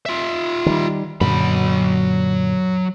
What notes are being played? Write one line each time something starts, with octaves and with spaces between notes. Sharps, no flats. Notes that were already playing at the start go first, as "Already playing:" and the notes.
F4 E5
D#3 G3
F#2 A#2 D3 F#3 B5